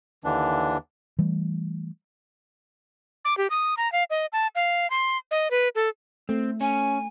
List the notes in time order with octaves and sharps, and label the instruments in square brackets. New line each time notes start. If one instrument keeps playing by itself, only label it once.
[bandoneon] D#2 D3 E3 D4
[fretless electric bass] E3 G3 A3
[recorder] D6
G4
D#6
A#5
F5
D#5
A5
F5
C6
D#5
B4
A4
[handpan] A3 [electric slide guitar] C4
[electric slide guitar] C#4 [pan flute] G#5